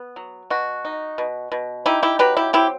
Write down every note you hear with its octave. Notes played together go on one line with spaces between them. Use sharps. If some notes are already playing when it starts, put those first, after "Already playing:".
Already playing: B3
F#3
B2 F#4
D#4
B2
B2
D#4 E4 G4
E4 G4
F#3 G4 B4
E4 G4
C4 E4 G4